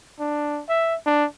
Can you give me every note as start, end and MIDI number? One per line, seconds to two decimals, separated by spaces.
0.20 0.61 62
0.69 0.96 76
1.06 1.26 62